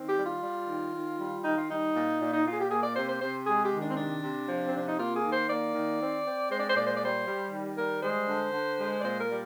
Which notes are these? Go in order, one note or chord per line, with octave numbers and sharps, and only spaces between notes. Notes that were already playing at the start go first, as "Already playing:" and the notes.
Already playing: D#3 C4
G4
G3
F4
G3
D#3
D#3
G3
D#3 D#4
F4
G3 D#4
A#2
A#2
D#4
A#2 F4
G#4
G4
A#3 G#4
D5
C3 C5
C5
C3 C5
G#3 G#4
G4
D#3
D4
C4
C3 D4
C3
F3
C4
C3 D4
D#4
A#3 F4
G#4
D#3
C5
A#3 D5
D#3
C4
C4
G#3 C5
D5
C5
A#2 D5
C5
D5
G3 C5
G3
D#3
G3 A#4
G#3 C5
D3
D3
G#3
D5
A#2 C5
A#4
G3